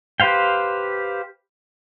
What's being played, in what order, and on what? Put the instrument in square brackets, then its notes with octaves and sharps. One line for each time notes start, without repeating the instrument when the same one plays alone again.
[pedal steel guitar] G4 B4 C5 F5 G5